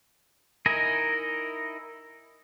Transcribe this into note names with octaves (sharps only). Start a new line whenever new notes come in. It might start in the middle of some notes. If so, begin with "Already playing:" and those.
D#4 E4 A#4 D#5 G#5